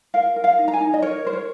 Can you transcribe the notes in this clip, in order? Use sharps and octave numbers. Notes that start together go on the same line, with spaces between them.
A#4 F5
A#4
F5
D#4
A#5
G#5
D#4
D#5
A#4 C#5
A#4 C5
C#5